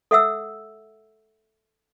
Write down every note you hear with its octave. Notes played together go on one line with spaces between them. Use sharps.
A4 E5 F#5 E6